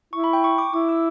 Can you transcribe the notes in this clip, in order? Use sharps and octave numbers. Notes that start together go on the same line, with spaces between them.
E4 C#6
B5
G5
C#6
D6
E4 D6
E6